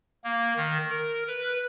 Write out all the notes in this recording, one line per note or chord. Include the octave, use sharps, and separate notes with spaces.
A#3
D#3
A#4
B4